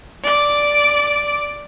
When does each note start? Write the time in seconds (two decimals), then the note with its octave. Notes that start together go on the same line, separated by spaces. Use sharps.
0.24 D5 D6